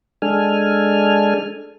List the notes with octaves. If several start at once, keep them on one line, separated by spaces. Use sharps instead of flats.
G#3 D4 A4 G#5 F6